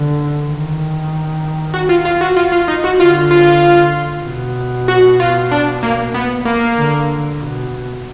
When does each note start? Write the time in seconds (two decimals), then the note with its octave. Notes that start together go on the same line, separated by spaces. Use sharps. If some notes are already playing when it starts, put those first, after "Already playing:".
Already playing: D3
0.48 D#3
1.74 F#4
1.89 F4
2.05 F4
2.21 F#4
2.37 F4
2.52 F4
2.68 D#4
2.84 F#4
3.00 D3 F4
3.31 F4
4.25 B2
4.88 F#4
5.20 F4
5.51 D4
5.83 A#3
6.14 B3
6.45 A#3
6.77 D3
7.40 B2